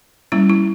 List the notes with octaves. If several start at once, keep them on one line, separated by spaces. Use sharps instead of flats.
G3 A#3 C#4 E4
E4